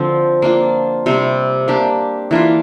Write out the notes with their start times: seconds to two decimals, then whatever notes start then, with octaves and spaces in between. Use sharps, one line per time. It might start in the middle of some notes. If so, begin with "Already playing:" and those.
Already playing: D3 F3 C4
0.42 A#3 D4 F4
1.06 C3 G3 C4
1.68 A#3 D4 G4
2.31 E3 A#3 D4 F4